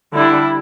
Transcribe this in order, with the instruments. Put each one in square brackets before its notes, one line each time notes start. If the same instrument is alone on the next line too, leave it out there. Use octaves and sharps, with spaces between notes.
[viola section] D3 G3 D4 E4